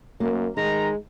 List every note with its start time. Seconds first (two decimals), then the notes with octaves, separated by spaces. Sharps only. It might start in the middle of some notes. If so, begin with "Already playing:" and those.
0.20 F#2 A#3
0.57 D#3 G#3 D#4 A#5